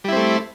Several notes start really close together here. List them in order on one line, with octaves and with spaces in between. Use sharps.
G3 E4 C4 A3